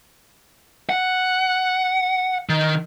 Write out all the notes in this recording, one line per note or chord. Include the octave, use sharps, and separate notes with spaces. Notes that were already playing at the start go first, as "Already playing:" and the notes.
F#5
D#3